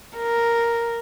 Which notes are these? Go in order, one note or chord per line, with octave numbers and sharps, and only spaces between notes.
A#4